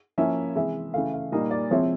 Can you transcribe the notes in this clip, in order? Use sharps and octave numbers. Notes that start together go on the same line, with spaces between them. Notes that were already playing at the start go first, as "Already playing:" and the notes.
F3 A#3 C#4 E4 E5
C3 E3 G#3 E5
C#3 E3 A3 F5
F5
A#2 G3 A#3 D#4 D#5
D5
C3 F3 G#3 C4 E4 C#5